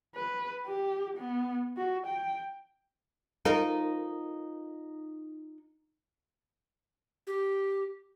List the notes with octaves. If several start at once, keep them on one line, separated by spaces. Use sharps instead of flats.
B4
G4
B3
F#4
G5
D#4 F4 A#4
G4